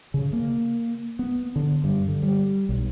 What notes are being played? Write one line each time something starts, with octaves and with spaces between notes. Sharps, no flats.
C#3
A#3
B3
D3
G2
D3
G3
B1